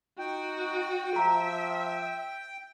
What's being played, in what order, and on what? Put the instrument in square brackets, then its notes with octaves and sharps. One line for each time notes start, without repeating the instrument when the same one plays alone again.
[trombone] D#4 [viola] F#4 [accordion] G5
[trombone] F3 [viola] E5 [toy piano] A#5